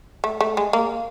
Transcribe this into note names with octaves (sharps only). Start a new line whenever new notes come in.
A3
A3
G#3
A#3